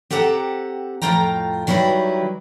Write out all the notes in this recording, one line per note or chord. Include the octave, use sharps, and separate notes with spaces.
C4 G4 A4 F#5 A#5
F2 A2 A3 F4 G5 A#5
D#3 F#3 G3 E4 B4